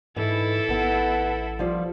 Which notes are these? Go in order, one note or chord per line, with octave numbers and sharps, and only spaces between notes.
G#2 E3 D#4 E4 A4
A1 B3 A5
F3 G3 F4